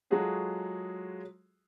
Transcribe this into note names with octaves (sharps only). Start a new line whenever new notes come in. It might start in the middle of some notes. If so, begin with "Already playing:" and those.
F#3 G#3 F4 F#4 G#4 A4